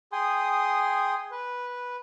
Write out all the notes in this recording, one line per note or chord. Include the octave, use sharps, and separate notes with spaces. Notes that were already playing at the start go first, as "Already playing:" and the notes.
G#4 G5 G#5 C6 D#6
B4